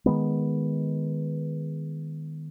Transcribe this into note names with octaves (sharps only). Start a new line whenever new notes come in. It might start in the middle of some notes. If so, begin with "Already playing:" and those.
D#3 G#3 B3